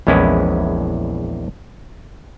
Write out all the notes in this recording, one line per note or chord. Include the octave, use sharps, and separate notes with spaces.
A#1 E2 G#3 C#4 E4 B4